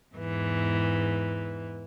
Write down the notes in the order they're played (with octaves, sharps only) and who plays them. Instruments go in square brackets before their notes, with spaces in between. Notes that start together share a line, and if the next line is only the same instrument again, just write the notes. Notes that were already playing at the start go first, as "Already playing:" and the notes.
[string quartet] E2 G#2 E3